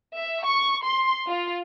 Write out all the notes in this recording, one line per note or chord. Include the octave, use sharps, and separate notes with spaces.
E5
C#6
C6
F4